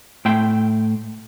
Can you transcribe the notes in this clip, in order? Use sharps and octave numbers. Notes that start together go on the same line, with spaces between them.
A2 E5 G5 C6